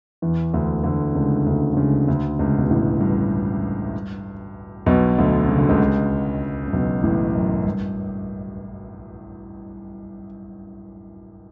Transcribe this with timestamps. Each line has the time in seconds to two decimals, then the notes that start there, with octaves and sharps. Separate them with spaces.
0.22 E2 E3
0.53 D2 D3
0.84 D2 D3
1.15 C#2 C#3
1.46 D2 D3
1.73 D3
1.77 C#2 C#3
2.08 D2 D3
2.39 C#2 C#3
2.58 B2
2.70 A1 A2
3.01 G2
4.86 B1 B2
5.18 D2 D3
5.48 C#3
5.59 D3
5.69 C#2 C#3
6.68 C#3
6.73 B1 B2
7.03 A1 A2
7.35 F#2
7.66 G2